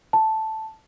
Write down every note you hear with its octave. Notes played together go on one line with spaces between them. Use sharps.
A5